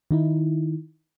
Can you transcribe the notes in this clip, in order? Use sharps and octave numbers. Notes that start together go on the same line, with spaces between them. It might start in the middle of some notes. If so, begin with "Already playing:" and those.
D#3 D#4 E4